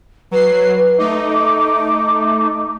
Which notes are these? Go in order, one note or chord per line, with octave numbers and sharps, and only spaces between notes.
F#3 B4 C7
A3 D#4 D6